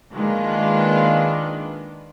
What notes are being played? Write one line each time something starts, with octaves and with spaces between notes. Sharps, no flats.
D#3 G#3 A#3 D4 F4 B4